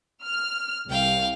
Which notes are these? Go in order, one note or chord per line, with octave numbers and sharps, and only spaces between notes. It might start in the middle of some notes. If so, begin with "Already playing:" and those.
F6
C2 F5 G5